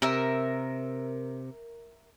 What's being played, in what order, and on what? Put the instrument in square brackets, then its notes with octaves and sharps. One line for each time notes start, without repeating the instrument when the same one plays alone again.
[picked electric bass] C3 [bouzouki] A#4 E5